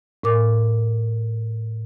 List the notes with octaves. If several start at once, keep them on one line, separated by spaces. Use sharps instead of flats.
A2 A#4 D6